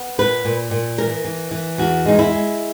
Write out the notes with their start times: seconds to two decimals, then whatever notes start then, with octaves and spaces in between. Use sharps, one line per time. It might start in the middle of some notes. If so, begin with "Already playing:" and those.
Already playing: B3
0.18 A#2 B4
0.45 A#2
0.71 A#2
0.98 E3 A#4
1.25 E3
1.51 E3
1.78 E2 F#4
2.05 G#3 D#4
2.19 E4
2.32 G#3